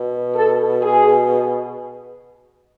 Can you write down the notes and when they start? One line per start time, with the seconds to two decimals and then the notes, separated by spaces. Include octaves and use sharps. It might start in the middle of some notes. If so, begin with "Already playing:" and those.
Already playing: B2
0.35 A4
0.81 G#4